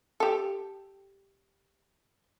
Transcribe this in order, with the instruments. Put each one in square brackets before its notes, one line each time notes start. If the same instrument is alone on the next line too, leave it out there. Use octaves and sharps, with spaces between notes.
[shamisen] G4 A4